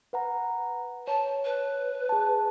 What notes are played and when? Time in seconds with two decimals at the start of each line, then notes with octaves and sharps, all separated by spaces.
0.13 B4 F#5 A#5
1.08 C#5 A5
1.45 B4
2.09 G#4 A5